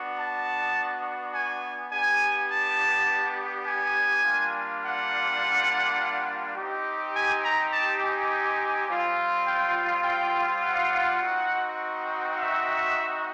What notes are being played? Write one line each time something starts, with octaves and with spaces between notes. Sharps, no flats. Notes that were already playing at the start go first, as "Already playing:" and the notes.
Already playing: B3 D4 F#4
A5
G#5
B3 D4 G4 G#5
A5
G#5
G3 A#3 D4 F4
F#5
C4 D#4 G4
G#5
A#5
A5
G#5
G3 C4 F4
G5
G5
F#5
C4 D#4 F#4
E5